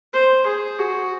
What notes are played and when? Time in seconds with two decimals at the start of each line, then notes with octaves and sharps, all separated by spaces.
0.13 C5
0.46 G#4
0.79 F#4